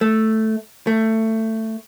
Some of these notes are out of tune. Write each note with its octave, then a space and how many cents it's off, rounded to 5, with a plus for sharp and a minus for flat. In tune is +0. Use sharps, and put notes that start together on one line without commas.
A3 +0
A3 +15